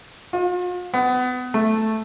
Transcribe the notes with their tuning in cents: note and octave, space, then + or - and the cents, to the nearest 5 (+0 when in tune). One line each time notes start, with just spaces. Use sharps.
F4 +45
B3 +25
A3 +0